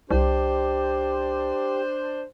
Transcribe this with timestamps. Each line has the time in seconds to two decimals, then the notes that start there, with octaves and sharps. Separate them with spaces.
0.11 C2 D4 G4 C5